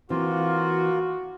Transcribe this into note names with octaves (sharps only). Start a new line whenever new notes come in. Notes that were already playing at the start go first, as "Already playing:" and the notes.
E3 A#3 C4 F4 F#4